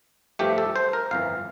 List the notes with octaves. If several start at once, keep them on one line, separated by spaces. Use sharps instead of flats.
G2 F3 A3 G4
A4
C5
A#4
G1 F2 E3 F5